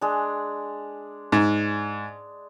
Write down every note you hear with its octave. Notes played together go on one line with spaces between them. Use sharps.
G#3 D4
G#2